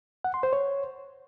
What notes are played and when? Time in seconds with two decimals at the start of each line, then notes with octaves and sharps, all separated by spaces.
0.24 F#5
0.34 C6
0.43 C5
0.53 C#5